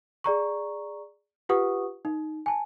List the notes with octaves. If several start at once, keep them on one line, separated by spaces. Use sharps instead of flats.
G#4 D5 A#5 C#6
F4 G4 B4 F#5 C#6 D#6
D#4
G#5 A5